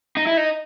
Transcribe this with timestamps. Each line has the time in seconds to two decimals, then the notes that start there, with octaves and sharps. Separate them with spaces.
0.17 D#4
0.27 E4
0.37 D#4